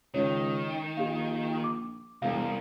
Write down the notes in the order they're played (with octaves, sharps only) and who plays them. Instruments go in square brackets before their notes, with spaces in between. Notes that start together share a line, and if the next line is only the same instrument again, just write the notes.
[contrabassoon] C#2 [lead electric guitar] D#3 [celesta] C#5
[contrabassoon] A#1 [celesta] G4 F5
[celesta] D6
[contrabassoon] E1 [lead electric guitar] C2 [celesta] F5